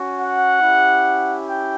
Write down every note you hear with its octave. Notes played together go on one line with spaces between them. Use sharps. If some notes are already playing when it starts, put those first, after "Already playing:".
Already playing: C#4 F#4
F#5
C#4 E4 G4
G5